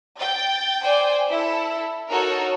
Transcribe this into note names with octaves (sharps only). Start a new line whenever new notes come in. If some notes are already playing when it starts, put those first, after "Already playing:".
G5 A6
C5 D5 G5 G#5
E4 A4
D#4 F#4 A4 A#4 C#5